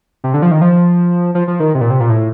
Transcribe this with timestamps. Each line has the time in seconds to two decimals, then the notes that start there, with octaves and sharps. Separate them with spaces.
0.24 C3
0.34 D3
0.42 F3
0.51 D#3
0.61 F3
1.35 F3
1.48 F3
1.60 D#3
1.75 C3
1.81 A#2
1.90 C3
2.00 A#2
2.09 A2